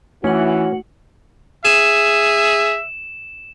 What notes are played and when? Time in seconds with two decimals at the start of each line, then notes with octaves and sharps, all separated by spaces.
0.24 E3 A3 C#4 F#4 C#7 F#7
1.65 G#4 E5 E7